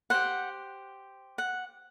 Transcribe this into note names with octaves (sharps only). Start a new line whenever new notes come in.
G4 C5 F#5
F#5